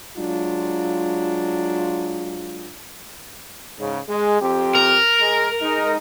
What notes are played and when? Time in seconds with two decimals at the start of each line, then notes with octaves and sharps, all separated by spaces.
0.17 F#3 G#3 D4 F4
3.79 G#2 C#3
4.08 G#3 G#4
4.40 F2 C4 G4
4.75 A#4
5.20 G#3
5.61 G#3 D#4